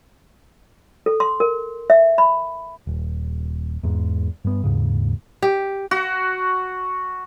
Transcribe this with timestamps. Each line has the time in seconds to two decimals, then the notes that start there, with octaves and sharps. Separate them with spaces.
1.06 A4
1.20 C6
1.40 A#4
1.90 E5
2.18 B5
2.87 D#1
3.83 E2 G#2
4.45 G2 B3
4.64 D#2 G#2 C#3
5.42 G4
5.91 F#4